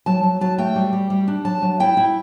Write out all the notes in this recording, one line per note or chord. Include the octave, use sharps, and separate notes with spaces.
F#3 A5
F#3
F#3 A5
A3 G5
G3
G3
G3
D4
F#3 A5
F#3
E4 G5
E4